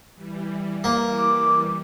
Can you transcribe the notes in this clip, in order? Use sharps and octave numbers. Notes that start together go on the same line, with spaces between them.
E3 G3
A#3
D6